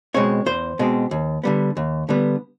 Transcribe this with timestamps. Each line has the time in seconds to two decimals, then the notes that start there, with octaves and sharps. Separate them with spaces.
0.14 B2 G#3 C4 C#5
0.46 E2 C5
0.79 B2 G#3 C4
1.11 D#2
1.44 D3 G3 B3
1.77 D#2
2.09 D3 G3 B3